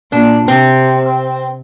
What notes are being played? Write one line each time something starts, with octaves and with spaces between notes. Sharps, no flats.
A#2 D4
C3 C4